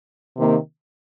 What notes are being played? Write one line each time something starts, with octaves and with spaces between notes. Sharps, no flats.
C3 D#3 A#3